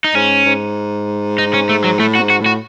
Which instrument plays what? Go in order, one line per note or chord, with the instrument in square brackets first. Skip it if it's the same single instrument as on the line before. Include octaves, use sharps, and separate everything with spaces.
[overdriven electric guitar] D#4
[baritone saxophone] G#2 [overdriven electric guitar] C#4
[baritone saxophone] G#2
[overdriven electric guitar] D#4
C#4
A3
F#3
[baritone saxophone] A2 [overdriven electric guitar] A3
[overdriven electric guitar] F#4
[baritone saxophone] G#2
[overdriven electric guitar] F#4
[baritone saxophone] A2
[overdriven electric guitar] F#4